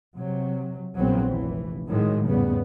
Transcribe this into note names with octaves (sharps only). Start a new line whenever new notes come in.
C3 F#3
A#1 A#2 E3 F#3 B3 C4
F1 E3
A2 D#3 F#3 G#3
E2 G#2 C#3 G3 B3